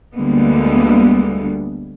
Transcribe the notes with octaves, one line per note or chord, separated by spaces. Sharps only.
D2 D3 G3 G#3 A#3 B3